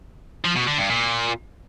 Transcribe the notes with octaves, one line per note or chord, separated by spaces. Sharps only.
F3
B2
D3
G2
A#2